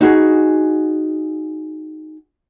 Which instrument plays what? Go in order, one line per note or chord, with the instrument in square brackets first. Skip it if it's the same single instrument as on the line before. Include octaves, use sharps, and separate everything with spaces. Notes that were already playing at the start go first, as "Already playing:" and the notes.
[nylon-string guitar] D#4 F#4 G#4